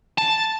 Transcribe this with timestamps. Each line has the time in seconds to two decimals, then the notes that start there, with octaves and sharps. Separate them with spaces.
0.18 A5